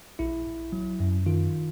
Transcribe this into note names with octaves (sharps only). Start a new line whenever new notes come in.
A#1 E4
A#1
F#3
F#2
D#3 F4